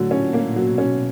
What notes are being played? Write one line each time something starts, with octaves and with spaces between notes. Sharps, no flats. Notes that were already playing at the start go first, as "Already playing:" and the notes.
Already playing: A2 D3 F#3
A#2 C#4
A#3
B2 F#3
C#4